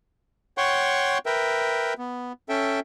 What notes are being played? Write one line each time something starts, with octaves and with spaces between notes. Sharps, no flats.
C#5 F#5 G5 C6 C#6
A#4 B4 E5 G5
B3
C#4 A4 E5 G5